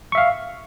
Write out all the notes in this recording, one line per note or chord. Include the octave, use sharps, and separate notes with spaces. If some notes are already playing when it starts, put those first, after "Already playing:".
E5 F5 C#6